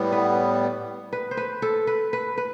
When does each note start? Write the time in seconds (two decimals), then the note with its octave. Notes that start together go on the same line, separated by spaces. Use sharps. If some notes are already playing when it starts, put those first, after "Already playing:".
Already playing: A2 G3 B3
0.12 B4
1.13 B4
1.31 C5
1.37 B4
1.62 A4
1.87 B4
2.13 B4
2.37 B4